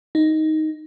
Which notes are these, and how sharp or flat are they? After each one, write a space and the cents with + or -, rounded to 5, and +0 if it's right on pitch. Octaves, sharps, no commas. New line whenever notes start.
D#4 +5